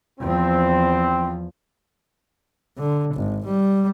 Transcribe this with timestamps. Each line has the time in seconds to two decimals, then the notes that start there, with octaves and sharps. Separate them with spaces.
0.20 E2 F3 C4
2.77 D3
3.14 G#1
3.45 G3